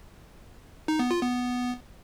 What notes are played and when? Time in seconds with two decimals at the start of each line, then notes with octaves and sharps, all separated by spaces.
0.88 D#4
0.99 B3
1.11 F4
1.22 B3